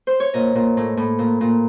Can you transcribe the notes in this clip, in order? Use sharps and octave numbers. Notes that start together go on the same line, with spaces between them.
C5
C#5
A#2 D#5
A#2
A2
A2
A#2
A#2